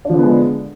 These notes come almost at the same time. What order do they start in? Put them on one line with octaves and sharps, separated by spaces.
D4 F3 D3 B3 G#3